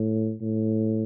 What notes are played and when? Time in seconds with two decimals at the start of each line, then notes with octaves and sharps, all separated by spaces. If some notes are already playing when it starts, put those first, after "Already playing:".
Already playing: A2
0.41 A2